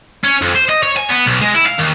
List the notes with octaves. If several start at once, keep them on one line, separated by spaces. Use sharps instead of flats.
C#4
F2
C5
D#5
C#5
G#5
B3
B1
G#3
E4
F5
D#2